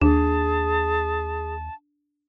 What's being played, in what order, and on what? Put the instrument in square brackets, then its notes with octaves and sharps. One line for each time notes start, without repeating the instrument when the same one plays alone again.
[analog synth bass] D#2 [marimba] D4 [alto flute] G#4 [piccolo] A5